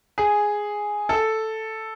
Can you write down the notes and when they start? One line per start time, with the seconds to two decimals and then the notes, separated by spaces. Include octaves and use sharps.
0.18 G#4
1.09 A4